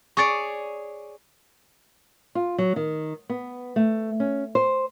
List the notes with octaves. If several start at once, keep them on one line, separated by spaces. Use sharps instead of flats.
G#4 C#5 D5 C#6 A6
F4
F#3
D#3
B3
A3
C#4
C5